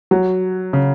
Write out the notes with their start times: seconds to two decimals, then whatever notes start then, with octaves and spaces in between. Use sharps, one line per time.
0.11 F#3
0.73 C#3